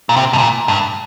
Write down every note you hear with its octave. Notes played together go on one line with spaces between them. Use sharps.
A#2
C3
G2
A#2
G2